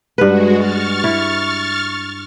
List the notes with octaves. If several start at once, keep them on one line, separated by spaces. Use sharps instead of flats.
G2 G#3 F#4 B4
C#6 F6 A6
E4